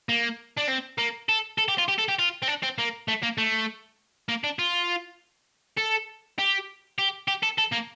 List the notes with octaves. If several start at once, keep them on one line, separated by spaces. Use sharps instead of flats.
A#3
D4
C4
A#3
A4
A4
G4
F4
G4
A4
G4
F4
C4
D4
C4
A#3
A3
A#3
A3
A#3
D4
F4
A4
G4
G4
G4
A4
A4
A#3